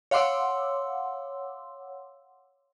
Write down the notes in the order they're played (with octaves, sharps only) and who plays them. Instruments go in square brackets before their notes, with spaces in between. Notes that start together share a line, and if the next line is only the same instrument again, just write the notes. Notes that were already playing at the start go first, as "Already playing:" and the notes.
[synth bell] C#5 F5 F#5 C6 D6 E6